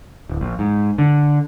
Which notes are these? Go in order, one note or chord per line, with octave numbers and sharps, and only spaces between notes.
D1
A#1
G#2
D3